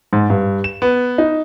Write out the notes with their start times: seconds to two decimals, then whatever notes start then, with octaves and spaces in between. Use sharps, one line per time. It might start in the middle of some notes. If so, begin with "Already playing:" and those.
0.13 G#2
0.30 G2
0.64 E7
0.82 B3
1.18 D#4